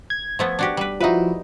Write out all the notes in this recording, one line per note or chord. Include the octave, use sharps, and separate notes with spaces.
G#6
F3 A3 B3
D4 F#4 G4
G3 B4
F3 D#4 E4 F#4 B4